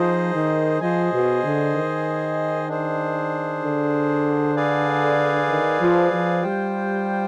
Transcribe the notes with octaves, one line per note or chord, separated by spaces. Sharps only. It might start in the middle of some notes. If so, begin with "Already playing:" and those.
Already playing: F3 D#4 G#4 C5 D#5
D#3
F3 G#4 C5 D#5 G#5
B2
D3
D#3
D4 G#4 C5
D3
G#4 B4 D5 F5 G#5
D#3
F3
F3
G3 F4 C5 G5